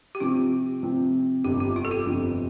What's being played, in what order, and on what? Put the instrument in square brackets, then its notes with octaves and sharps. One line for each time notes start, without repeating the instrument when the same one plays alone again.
[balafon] G4
[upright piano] C3 F3 C4 [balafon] F4
[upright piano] C3 F3 C4
[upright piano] G1 F2 C3 F3 [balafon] G4
[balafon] G4
F4
A4
G4
[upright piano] G1 F2 C3 F3